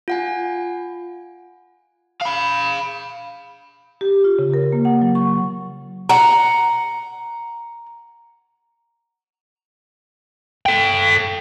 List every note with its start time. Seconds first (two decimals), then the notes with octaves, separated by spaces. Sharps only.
0.08 F4 F#5 G#5
2.22 F5 B5
4.01 G4
4.24 F4
4.39 C#3
4.54 A#4
4.72 A#3
4.85 F#5
5.02 F#3
5.15 C#6
6.10 F#5 A#5
10.66 A4 G5